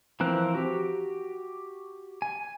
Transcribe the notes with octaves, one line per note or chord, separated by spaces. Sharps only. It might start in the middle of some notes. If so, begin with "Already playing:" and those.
E3 F3 C4 A#4 F#6
F#4 G4
G#5